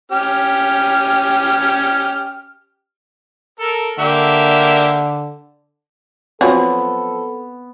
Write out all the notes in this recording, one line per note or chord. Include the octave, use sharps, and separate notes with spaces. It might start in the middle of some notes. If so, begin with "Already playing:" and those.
C#4 G4 F6
A4 A#4
D3 A#3 G4 E5
F3 F#3 B3 C4 A4